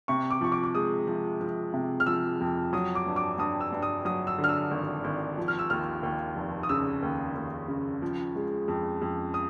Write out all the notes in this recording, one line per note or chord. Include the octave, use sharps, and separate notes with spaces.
C3 C#6
D6
F3 C#6
D6
D6
G#3 D#6
F3
F3
C3
F6
F3 E6
F2
F#3 D#6
D6
G2
D6
G2 D#6
E6
G2
D#6
F#3 D#6
E6
D3
F6
E6
G#1
G#1
F3
F6
E6
D#2 F6
D#2
F1
D#6
C#3 E6
D#2
D#2
C#3
F3
G#3
F2
F2
D#6